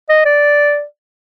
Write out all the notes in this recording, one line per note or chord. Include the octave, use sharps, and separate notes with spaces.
D#5
D5